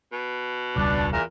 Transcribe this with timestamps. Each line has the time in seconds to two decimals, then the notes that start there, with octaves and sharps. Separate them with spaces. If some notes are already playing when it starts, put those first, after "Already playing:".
0.12 B2
0.76 E1 C#2 G3 D4
1.12 E2 A#2 E3 A#4